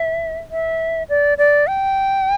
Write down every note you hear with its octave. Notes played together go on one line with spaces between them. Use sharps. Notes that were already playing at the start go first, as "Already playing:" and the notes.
Already playing: E5
E5
D5
D5
G5